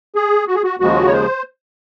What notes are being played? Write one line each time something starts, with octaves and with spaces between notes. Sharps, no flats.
G#4
F#4
G#4
F#4
D#2 C#3 F3 G#3 F#4
C#5
C5